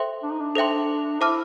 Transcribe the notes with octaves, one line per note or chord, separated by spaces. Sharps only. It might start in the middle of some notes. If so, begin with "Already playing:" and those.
Already playing: A4 C5 E5 G5 C6
D4
D#4
D4
A4 C5 E5 G5 C6
E4 C5 E5 A5 D6 F6